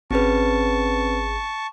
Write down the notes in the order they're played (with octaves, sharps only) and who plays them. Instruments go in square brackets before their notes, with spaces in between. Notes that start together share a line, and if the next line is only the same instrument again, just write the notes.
[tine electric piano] G#1 G#4 [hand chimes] C4 C#4 B4 [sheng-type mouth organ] A5 C#6